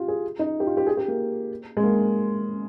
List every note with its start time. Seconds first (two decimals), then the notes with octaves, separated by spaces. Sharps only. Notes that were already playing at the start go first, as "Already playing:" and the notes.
Already playing: F4 G4
0.08 G#4
0.39 D#4
0.60 G4
0.67 F4
0.77 G4
0.87 G#4
0.97 G4
1.08 A#3
1.77 G#3
1.83 A#3